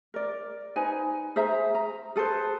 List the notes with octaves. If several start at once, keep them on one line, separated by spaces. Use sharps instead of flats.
A#4 D5
D#4 B4 C5 G#5
G#4 C5 E5 A#5
A#5
G#4 A4 B4 C5